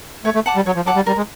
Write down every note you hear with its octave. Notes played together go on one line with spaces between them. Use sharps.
A3 C#5
A3
F#5 A5 D6
G3
F#3 C#5
F3
F#3 F#5 A5 D6
G3
G3 A#4
G#3